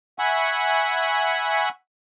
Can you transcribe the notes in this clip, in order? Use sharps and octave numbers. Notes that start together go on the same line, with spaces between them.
E5 F#5 G#5 B5 C#6